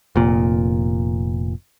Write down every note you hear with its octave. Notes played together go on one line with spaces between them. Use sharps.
F1 A#2